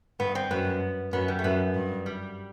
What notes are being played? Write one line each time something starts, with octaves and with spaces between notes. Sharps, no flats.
G2 B3
C4
F#2 B3
F#2 B3
G3
A3
F#2 B3
G2
G3